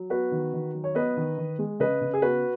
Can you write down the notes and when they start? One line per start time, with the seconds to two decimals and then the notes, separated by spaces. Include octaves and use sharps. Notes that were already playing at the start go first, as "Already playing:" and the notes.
Already playing: F#3
0.10 B3 F#4 B4
0.32 D#3
0.53 D#3
0.74 F#3
0.84 C#5
0.95 B3 B4 D#5
1.17 D#3
1.38 D#3
1.59 G#3
1.80 C#3 B4 D#5
2.01 C#3
2.13 G#4
2.22 B3 F#4 B4